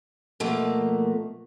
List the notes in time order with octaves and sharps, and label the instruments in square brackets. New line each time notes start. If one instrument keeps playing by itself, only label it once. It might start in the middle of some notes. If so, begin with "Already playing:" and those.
[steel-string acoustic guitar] B2 F3 A3 A#3